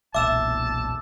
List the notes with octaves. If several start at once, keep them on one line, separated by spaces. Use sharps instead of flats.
E1 B1 A#2 E5 A5 D6 E6 E7